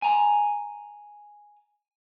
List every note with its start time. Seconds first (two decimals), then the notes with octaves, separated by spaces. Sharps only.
0.02 G#5 A#5